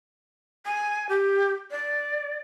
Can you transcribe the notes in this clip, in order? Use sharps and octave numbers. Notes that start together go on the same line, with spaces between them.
G#5
G4
D5